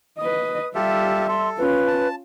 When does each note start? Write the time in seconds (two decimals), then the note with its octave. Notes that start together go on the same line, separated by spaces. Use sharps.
0.19 B4 D#5 D#6
0.75 G3 F4 G4 A4 E5
1.28 A4 C6
1.58 C#4 F4 B4
1.87 A5